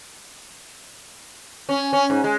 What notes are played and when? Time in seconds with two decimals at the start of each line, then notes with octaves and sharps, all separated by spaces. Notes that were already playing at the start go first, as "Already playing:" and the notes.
1.69 C#4
1.93 C#4
2.10 G#2
2.24 G#3